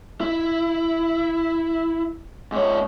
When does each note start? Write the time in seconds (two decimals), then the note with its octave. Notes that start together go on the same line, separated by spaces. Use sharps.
0.21 E4
2.52 G#2 C#5